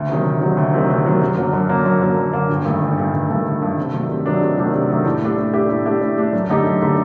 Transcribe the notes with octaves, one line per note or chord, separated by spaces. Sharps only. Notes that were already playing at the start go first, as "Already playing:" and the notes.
Already playing: D2
C3 D#3 F#3
D2
C3 D#3 F#3
D2
C3 D#3 F#3
D2
C3 D#3 F#3
F#2
D3 F#3 A#3
F#2
D3 F#3 A#3
F#2
D3 F#3 A#3
F#2
D3 F#3 A#3
G1
G2 D#3 A3
G1
G2 D#3 A3
G1
G2 D#3 A3
G1
G2 D#3 A3
C3
D#3 F#3 A3 D4
C3
D#3 F#3 A3 D4
C3
D#3 F#3 A3 D4
C3
D#3 F#3 A3 D4
A2
A3 D4 G4
A2
A3 D4 G4
A2
A3 D4 G4
A2
A3 D4 G4
F#2
D3 A3 D#4 G4
F#2
D3 A3 D#4 G4